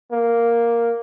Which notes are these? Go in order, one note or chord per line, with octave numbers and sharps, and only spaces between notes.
A#3